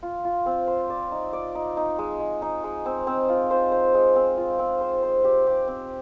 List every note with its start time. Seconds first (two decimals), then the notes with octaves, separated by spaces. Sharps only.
0.03 F4
0.25 F4
0.46 C4
0.68 C5
0.90 D5
1.12 D#4
1.33 D5
1.55 D#4
1.77 D#4
1.99 G#3
2.20 G#3
2.42 D#4
2.64 G#3
2.86 C4
3.07 C4
3.29 F4
3.51 C5
3.72 C5
3.94 G#3
4.16 C4
4.37 F4
4.59 C4
4.81 C5
5.03 C5
5.24 G4
5.47 G4
5.67 C4